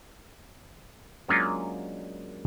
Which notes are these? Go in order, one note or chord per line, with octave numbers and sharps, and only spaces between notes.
F#3 G#3 A#3 C#4 D4 F4